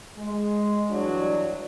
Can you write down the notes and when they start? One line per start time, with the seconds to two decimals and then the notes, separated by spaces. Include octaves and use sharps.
0.17 G#3
0.90 G2 E3 F#3 D4